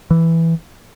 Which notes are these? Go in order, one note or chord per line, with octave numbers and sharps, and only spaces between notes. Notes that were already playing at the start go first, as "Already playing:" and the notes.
E3